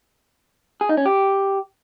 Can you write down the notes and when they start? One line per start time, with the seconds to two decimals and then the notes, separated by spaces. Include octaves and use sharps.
0.81 G#4
0.89 D#4
0.97 C#4
1.06 G4